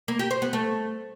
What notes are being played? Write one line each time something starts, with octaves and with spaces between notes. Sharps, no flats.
A#3
G4
C5
B3
A3